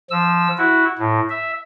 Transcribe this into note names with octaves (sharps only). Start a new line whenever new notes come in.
F3 E6
E4 F#4
A2
E5